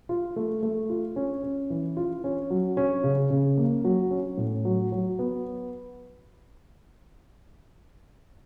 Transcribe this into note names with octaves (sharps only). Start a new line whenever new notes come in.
F4
A3
A3
F4
C#4
C#4
E3
F4
C#4
F#3
C#4
C#3
C#3
A#3
F#3
C#4
A2
F#3
F#3
B3